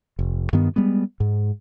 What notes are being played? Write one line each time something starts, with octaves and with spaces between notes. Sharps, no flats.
F1
G2 D#3 B3
G3 G#3 B3
G#2